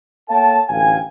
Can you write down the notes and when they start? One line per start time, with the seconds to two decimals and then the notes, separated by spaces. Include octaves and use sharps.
0.29 A#3 A4 C#5 F5 G5 A5
0.69 A1 D2 F5 G5 G#5